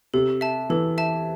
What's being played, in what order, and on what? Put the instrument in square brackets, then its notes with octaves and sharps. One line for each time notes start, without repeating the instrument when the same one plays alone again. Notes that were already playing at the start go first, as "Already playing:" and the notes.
[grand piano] C3 [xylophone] A4
[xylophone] E5 A5
[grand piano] E3 [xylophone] A4
[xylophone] E5 A5